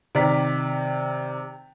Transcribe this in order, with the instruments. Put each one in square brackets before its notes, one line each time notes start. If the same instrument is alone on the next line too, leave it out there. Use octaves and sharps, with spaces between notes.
[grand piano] C3 D#3 D5 A#5 B6